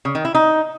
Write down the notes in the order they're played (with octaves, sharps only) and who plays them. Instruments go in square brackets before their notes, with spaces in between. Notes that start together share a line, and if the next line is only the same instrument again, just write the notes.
[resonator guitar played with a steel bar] C#3
D#3
E4
D#4